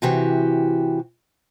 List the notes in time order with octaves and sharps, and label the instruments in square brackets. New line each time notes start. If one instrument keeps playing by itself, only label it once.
[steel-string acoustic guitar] C3 E3 F#4 G4